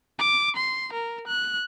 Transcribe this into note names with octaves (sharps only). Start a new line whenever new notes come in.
D6
C6
A#4
F#6